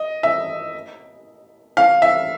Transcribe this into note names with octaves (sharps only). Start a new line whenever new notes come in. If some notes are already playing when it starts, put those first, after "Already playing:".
Already playing: D#5
E5
F5
E5